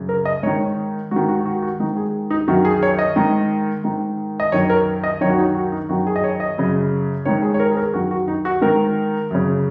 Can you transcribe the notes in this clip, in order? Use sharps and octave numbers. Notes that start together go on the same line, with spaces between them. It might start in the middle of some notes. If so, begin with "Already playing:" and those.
Already playing: F#2 C#3
A#4
D#5
G#2 D#3 C#5
G#2 D#3 F#4
F#4
F#4
F#4
G#2 D#3 D#4
G#4
D#4
F#2 D#3 F#4
G#4
C#5
D#5
G#2 D#3
G#2 D#3
D#5
F#2 D#3 C#5
A#4
D#5
F#2 D#3 C#5
F#4
D#4
F#4
D#4
F#2 D#3 F#4
G#4
D#5
C#5
D#5
F#2 C#3
G#2 D#3 C#5
G#4
C#5
A#4
G#4
A#4
F#2 D#3 F#4
F#4
D#4
F#4
G#2 D#3 A#4
F#2 C#3